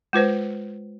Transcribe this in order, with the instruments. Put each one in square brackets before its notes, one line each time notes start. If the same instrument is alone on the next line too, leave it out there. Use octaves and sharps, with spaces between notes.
[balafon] G#3 F4 B4 C5